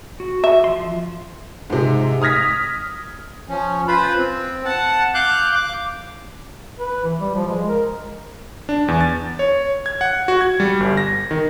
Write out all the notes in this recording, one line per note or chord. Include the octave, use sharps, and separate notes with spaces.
F#4
E5
F3 C6
G#2 C3
D#6 F6 G#6 A#6 B6
F3 C#4
F4 B4 C5 B5
C4
F#5 A5
F5 D6 F#6 G6
D6
B4
E3
G3
F3
G#3
A#4
D4
E2
A6
C#5
G#6
F#5
F#4
G#6
G3
G1
A#6
D#3